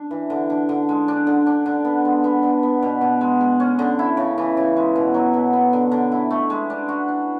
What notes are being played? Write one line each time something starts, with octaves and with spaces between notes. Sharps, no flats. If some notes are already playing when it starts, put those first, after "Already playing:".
Already playing: D4
E3
D3
D3
D3
G#3
D4
D3
D4
D3
B3
G#3
B3
D3
B3
B2
B2
G#3
G#3
C#4
D3
E4
C#3
E3
C#3
G#3
B2
F#3
B2
B3
D3
D3
E4
A3
G#3
D4
F#4
D4